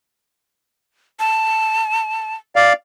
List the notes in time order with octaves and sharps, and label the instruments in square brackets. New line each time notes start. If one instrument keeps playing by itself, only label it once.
[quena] A5
[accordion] D5 F5